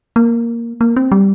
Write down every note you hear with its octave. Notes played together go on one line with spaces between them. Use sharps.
A#3
A#3
C4
G3